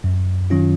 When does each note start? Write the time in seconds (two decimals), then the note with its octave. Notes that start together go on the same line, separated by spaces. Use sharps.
0.04 F#2
0.50 D#3 F#3 C#4 F4